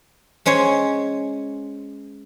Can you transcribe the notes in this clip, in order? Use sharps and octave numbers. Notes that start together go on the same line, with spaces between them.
G#3 C#4 C5 C#5